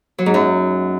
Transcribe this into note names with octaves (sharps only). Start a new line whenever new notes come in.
F#3
G#2
F#2